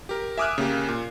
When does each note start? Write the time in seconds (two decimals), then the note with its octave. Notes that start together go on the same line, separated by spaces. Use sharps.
0.09 G4 A#4
0.38 E5 G#5 D6 D#6 F6 F#6
0.58 C#3 A#3 G4
0.89 A#2